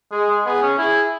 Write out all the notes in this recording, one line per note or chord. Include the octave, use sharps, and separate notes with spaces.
G#3 G#4
G#3
B3 G#4
C#4
E4 G#4